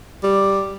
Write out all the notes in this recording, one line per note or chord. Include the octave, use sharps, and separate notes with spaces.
G3